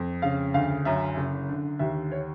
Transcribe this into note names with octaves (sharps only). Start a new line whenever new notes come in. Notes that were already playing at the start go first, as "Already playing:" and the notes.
Already playing: F2
C#3 F5
D2 F5
F#2 E5
F#1
D3
D#2 E5
C#5